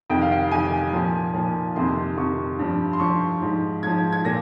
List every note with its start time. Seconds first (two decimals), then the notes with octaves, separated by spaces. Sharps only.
0.10 F2 C3 D#3 G5
0.22 F5
0.32 G5
0.51 F2 C3 D#3 G#5
0.93 A#2 F3
1.34 A#2 F3
1.76 F2 C3 D#3 C6
2.17 F2 C3 D#3 C#6
2.59 G2 F3
2.93 C6
3.00 G2 F3 C#6
3.42 G#2 F3
3.83 G#2 F3 G#6
4.13 G#6
4.25 A#2 A#6